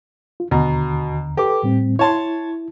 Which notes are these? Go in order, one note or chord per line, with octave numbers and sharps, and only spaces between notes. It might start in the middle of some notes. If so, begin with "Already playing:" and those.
F4
D#2 B2 D3 A#5
G4 A4 B4 D6
A2 G3 C4
E4 C#5 A5 C6